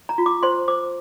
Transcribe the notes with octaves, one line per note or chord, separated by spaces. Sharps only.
A#5
F4
D6
C5 C6
C5 D6